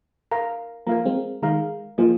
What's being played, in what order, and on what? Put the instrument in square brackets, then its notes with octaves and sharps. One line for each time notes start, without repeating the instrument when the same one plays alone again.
[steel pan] A#4 F5 A#5
[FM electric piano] F3 A#3 [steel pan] A#4 F5 A#5
[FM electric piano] G#3 C4
[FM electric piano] D#3 G#3 [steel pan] A#4 F5 A#5
[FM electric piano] F3 A#3 [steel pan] F4 G#4 D#5